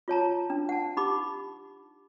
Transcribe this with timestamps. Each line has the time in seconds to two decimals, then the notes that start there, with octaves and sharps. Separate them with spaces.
0.08 F4 C#5 A5 A#5
0.50 D4
0.69 F#5 A5
0.97 D#4 G4 B5 D6